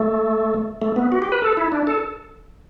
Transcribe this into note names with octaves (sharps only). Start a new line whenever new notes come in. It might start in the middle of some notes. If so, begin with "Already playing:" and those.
Already playing: A3
A3
B3
F#4
G4
B4
A4
E4
D4
A4